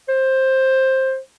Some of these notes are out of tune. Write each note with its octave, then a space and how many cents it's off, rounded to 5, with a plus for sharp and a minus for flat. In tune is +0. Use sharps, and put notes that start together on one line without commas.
C5 +15